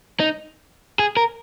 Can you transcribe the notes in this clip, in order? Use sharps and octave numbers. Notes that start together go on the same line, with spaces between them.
D#4
G#4
A#4